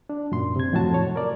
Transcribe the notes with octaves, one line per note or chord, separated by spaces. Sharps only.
D4
F#2 A#2 C6
C3 G#6
F2 A2 F#3 F#4 A5
C#5
A#4 D5